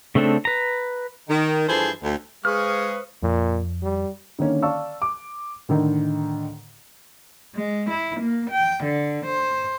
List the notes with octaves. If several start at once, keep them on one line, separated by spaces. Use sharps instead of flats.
C#3 A3 C4 D4 A4
B4 A#5
D#3
G2 E3 F3 G#4 A4 C5
D2
G#3 G#4 B4 C5 F5 C#6 D#6 F6
F2 A#2
G3
D3 D#3 A#3 C#4
D5 F5 A5 C#6 E6
D6
A2 D3 D#3
G#3
E4
A#3
G5
D3
C5